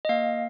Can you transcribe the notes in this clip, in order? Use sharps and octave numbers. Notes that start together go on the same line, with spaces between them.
D#5
A#3 F5